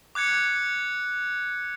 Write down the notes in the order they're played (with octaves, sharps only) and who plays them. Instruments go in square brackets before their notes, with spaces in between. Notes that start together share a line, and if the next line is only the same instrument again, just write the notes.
[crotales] D6 F#6 G#6 C#7